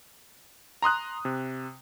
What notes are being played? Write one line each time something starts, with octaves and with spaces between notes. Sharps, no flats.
A#5 C6 D#6 F#6
C3